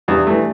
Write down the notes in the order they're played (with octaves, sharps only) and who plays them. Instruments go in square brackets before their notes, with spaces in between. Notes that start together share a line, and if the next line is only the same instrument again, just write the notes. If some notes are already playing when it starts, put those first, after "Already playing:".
[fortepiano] E2 [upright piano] D4 G4
[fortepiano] E3 A3